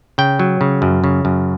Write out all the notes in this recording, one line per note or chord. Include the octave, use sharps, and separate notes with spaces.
C#3 G5
F#3
C#3
F#2
C#3
F#2